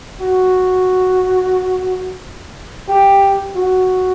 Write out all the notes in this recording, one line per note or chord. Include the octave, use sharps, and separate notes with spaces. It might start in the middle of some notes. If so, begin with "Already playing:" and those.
F#4
G4
F#4